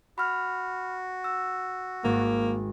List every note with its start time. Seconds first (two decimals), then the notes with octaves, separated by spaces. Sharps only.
0.18 F#4 B5 F6
1.24 E6
2.04 G#1 A#3